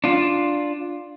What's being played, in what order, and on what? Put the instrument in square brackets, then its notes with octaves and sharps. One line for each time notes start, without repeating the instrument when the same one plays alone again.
[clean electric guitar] D4 F4